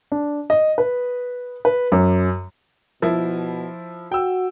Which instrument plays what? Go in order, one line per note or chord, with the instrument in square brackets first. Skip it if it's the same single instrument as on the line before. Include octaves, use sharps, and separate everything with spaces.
[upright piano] D4
D#5
B4
B4
F#2
[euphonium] B2 [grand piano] F3 E4
[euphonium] F#4 [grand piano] G5 E6